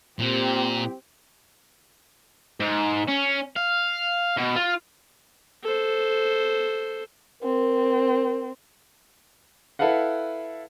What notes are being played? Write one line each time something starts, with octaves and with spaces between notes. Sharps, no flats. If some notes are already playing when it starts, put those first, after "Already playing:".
A#2 C4 G4
G#2
C#4
F5
B2
F4
A4 C5
C4 A#4
E4 A4 B4 F5 F#5